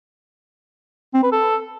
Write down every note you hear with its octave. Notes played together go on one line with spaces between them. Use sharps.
C4
B4
A4